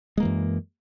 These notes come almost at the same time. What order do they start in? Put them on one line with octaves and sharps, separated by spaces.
G#3 A#3 E3 F#2